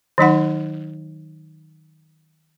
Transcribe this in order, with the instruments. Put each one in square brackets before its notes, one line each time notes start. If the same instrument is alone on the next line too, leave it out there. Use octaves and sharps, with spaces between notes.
[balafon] D#3 F#3 D#4 F#5